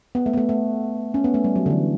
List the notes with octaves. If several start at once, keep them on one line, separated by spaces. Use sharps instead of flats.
B3
A3
B3
A3
A3
C#4
B3
A3
G3
F#3
D3
E3